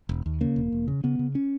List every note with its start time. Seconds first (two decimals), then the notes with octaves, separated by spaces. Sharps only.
0.09 E1
0.26 D#2
0.41 C#3 A#3
0.56 E1
0.72 E1
0.88 C#3
1.04 C#3 B3
1.19 C#3
1.35 C#4